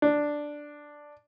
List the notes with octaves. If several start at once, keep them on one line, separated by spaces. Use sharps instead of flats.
D4